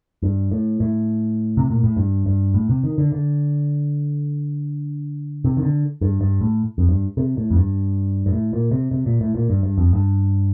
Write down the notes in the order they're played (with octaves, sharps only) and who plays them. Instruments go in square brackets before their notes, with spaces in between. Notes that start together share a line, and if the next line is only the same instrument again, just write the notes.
[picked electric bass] G2
A2
A2
C3
A#2
A2
G2
G2
A2
C3
D#3
D3
D3
C3
D#3
D3
G2
G2
A2
F2
G2
C3
A2
F2
G2
G2
A2
A#2
C3
C3
A#2
A2
A#2
G2
G2
F2
G2